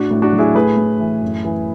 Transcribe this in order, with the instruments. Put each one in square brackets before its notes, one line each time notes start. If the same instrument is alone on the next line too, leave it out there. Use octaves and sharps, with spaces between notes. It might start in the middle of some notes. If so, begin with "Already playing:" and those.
Already playing: [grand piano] A2 D4 F#4
A2
D4 F#4
F#3
E4 G#4
A2 G#4 B4
A2
E3
F#2
E3